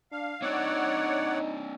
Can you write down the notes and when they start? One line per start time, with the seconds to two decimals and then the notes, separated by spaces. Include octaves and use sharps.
0.12 D4 F5
0.42 C4 D4 D#4 C#5 D5 F#5